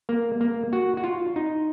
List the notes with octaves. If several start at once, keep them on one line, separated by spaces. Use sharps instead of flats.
A#3
A#3
F#4
F#4
F4
D#4